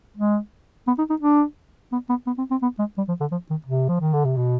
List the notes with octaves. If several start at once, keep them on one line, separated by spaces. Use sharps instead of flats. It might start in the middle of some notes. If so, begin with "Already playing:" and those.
G#3
B3
D#4
D#4
D4
B3
B3
B3
C4
C4
B3
G#3
G3
F3
D3
F3
D#3
C3
F3
D#3
D3
C3
B2